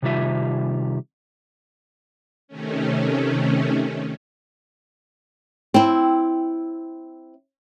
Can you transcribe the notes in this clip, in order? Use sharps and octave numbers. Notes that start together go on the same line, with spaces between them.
C3 D#3 G3 F4 E5
C3 D#3 A3 C#4
C4 E4